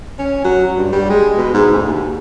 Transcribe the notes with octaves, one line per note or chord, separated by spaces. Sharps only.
C#4
F#3
G2
G3
G#3
B2
G#2
D2
D#2